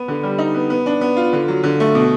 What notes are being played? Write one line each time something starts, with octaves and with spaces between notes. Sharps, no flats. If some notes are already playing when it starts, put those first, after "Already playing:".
Already playing: B3
D3
G3
D#4
B3
B3
D4
B3
F4
D3
F#3
D3
A3
B2